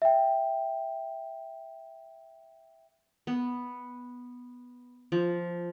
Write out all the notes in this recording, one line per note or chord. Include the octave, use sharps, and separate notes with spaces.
E5 G5
B3
F3